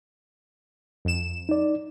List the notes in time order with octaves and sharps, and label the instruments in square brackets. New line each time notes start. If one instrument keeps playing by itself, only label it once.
[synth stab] F2 E7
[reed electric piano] D#4 D5